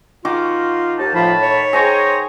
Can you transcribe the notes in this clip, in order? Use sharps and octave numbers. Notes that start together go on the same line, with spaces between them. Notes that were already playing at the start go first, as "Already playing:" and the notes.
D#3 F4 F#4 D6
D#2 D#4 A5
A2 F3 A5 B5
C#5
G#4 C5 D#5 G5 A#5 C#6